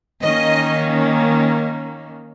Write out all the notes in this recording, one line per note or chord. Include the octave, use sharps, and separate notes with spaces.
D#3 A#3 C#4 D#5